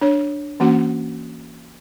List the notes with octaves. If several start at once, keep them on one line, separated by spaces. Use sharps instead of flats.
D4 C#5
E3 A#3 C#4 F#4 F#5